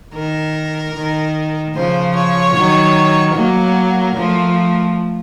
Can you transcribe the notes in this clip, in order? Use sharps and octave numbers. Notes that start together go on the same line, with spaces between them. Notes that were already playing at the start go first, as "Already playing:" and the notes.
D#3 A#4
D#3
C#3 F3 C5
C#5
D#3 F#3
F#3 A#3 A#4
F3 A3